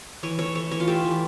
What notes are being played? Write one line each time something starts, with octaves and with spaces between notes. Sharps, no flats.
E3 C#5
A3 C#5
A3 C#5
E3 C#5
F4
A3 G4
E3